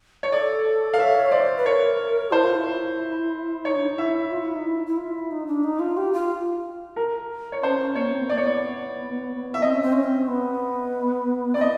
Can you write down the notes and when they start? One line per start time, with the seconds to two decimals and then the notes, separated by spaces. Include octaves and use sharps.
0.23 C#5
0.32 A4 D5
0.94 F5
0.99 C#5 E5
1.31 C5 D5
1.57 B4
1.65 A#4 C#5
2.31 E4 C5
2.43 F4
2.55 E4
3.65 D#4 C#5
3.76 D4
3.86 D#4
3.98 E4 E5
4.31 F4
4.43 E4
4.55 D#4
4.67 E4
4.87 E4
4.97 F4
5.13 E4
5.31 D#4
5.47 D4
5.64 D#4
5.80 F4
5.97 G4
6.13 F4
6.96 A#4
7.52 C#5
7.63 C#4 C5
7.79 C#4
7.95 A#3 C#5
8.13 C4
8.23 B3
8.29 A#3 D5
8.37 C#5
8.41 B3 D5
9.54 E5
9.61 C4 D#5
9.73 C#4
9.82 C4
9.93 C#4
10.03 C4
10.28 B3
11.54 C4 D5
11.61 B3 D#5